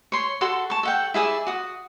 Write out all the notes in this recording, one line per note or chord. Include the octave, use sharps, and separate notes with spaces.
C#5 C6
F#4 A4 C6
A5 C#6
A4 F#5 G5
E4 G#4 D5 E5
F#4 D#6